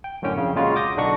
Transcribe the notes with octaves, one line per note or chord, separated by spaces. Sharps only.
G5
F#2 A2 D3 C#4 G5
F2 C#3
A#2 C#3 G#3 F4 F#4
D6 D#6 G6 A#6
B1 D3 D4 D#4 F#4 C#6